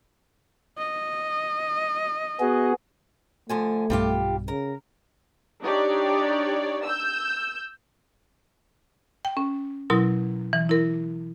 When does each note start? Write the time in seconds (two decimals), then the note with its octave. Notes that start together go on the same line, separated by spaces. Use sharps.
0.78 D#5
2.40 B3 F#4 G#4
3.49 D3 F3 A3 G#5
3.90 B1 G2 G3 F4 G4
4.48 C#3 A#4
5.63 D4 D#4 G4 C#5 D5
6.84 E6 G6
9.25 G5
9.37 C#4
9.90 B2 F#3 E4 A#4 C6
10.53 E3
10.69 E4 A#4